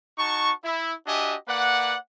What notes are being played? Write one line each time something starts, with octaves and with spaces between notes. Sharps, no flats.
D#4 F#4 A5 C#6
E4
D4 F#4 G4 D#5 E5 G#5
A#3 B4 D5 F#5